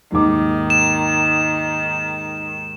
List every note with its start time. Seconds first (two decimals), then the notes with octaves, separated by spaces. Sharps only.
0.12 D#2 G#2 D#3 D6
0.70 E7